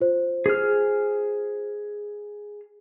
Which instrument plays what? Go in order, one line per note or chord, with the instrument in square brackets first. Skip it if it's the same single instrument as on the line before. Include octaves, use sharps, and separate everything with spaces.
[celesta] F4 C5
[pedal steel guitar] G#4 F6